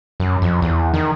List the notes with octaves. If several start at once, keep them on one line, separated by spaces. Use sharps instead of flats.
F#2
F2
E2
D#3